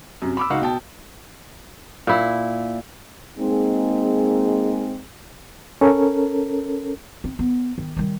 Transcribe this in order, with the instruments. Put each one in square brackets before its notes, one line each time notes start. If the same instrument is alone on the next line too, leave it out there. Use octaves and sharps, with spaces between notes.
[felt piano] F#2 C3
B5 D6 E6
C#2 D#4 F#4 F5 F#5
B2 G5 A5
[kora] A#2 E4
[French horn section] G#3 A#3 C4 D#4 G#4
[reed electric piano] C#4 A4 A#4
[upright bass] C4
B3
D#3
D#3 G3